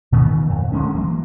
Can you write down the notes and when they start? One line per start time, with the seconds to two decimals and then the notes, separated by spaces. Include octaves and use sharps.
0.12 A#2 D#3 E3 B3
0.49 F2
0.72 D3 F3 G#3 C#4
0.95 E3 F#3 A#3